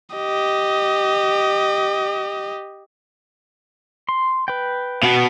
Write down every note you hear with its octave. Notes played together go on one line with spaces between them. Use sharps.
G4 D#5
C6
B4 G5
B2 B3